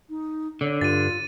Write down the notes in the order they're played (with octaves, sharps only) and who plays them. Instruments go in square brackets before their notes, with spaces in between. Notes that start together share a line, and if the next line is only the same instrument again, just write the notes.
[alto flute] D#4
[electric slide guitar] D3 [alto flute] C#5
[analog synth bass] G2 [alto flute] F4 [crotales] A6 D#7